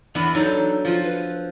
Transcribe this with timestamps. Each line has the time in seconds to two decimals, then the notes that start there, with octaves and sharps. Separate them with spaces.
0.15 E2 B3 D4 B5
0.35 F#3 D#4 A4
0.85 F3 F4
1.04 B4